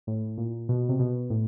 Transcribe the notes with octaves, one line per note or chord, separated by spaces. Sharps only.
A2
A#2
B2
C3
B2
A2